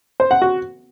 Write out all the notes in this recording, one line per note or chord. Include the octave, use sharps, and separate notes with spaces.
C5
F#5
F#4